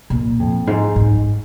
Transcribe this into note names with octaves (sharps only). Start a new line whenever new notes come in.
A#2
F2
G#2
G#2